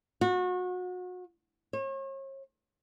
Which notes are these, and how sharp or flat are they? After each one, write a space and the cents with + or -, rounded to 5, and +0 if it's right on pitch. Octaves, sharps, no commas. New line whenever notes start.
F#4 -30
C#5 -40